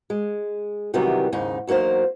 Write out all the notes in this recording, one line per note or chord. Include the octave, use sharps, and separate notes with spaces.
G#3
C3 D#3 E3 F#3 G3 B3
D#2 G#2 C#3 D#4
E2 F#3 A#3 D#4 C5